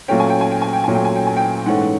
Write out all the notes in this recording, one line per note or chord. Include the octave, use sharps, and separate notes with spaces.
A#2 F#3 A3 C#4 G5
G#5
G5
G#5
G5
G#5
G5
A#2 F#3 A3 C#4 G#5
G5
G#5
G5
G#5
G5
G#2 E3 A3 C#4 F#5